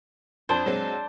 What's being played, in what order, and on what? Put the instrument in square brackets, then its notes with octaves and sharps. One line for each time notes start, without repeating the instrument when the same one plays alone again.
[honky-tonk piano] F2 [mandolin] D4 C5
[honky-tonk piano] F#3 G#3 C4